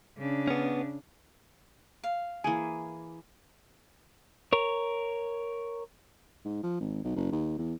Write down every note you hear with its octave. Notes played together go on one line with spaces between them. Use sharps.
C#3 D4
B3 C#4
F5
E3 A#3 G#4 G#5
A#4 C#5
G#2
F3
G#1
B1
F#1
D#2
E2